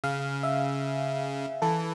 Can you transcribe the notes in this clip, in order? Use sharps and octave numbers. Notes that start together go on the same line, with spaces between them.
C#3 F5
E5
E3 A4